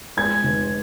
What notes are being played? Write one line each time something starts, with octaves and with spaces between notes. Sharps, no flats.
G#3 G#6
F1